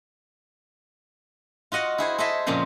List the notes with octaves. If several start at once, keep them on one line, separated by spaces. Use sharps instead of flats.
F4 F#4 D#5 F#5
E4 G#4 C5
G#4 A4 C5 D#5 E5
F2 A#2 C#3 A#3 C#4 C5